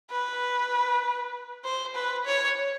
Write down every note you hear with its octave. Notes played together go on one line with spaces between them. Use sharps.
B4
C5
B4
C#5